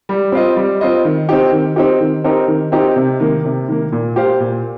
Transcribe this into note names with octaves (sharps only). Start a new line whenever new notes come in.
G3
C4 F4 D#5
G3
C4 F4 D#5
D#3
C4 D#4 G4
D#3
C4 D#4 G4
D#3
C4 D#4 G4 A#4
D#3
C4 D#4 G4 A#4
C3
D#3 A#3
C3
D#3 A#3
A#2
A#3 G4 C5 F5
A#2